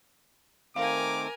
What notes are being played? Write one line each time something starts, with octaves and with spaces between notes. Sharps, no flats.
D#3 A3 C4 A#4 F5 G#5 D6